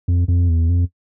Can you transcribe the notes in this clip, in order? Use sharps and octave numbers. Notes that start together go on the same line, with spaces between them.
F2
F2
E2
F2